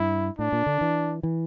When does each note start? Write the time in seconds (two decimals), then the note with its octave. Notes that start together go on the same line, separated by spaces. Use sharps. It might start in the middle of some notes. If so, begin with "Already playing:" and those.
Already playing: G2 E4
0.39 A2 D4
0.52 A#2
0.66 D3
0.81 E3
1.23 E3